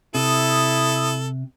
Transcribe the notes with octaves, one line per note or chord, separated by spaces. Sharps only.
C3 E4 A4 D#6